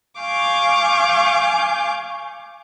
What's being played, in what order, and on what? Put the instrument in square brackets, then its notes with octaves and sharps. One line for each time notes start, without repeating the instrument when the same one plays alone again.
[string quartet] F5 G#5 C#6 D6 G6